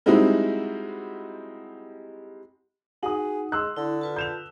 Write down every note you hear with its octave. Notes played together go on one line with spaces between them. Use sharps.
G3 G#3 C4 D#4 E4 F#4
D#4 F#4 G#4 F#5 D#6
G#3 C6 E6 F#6
D3 E4
F4 B4 A5
G6 E7 F7